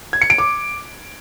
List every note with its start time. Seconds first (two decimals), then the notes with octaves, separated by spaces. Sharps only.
0.13 G#6
0.22 C#7
0.30 D7
0.38 D6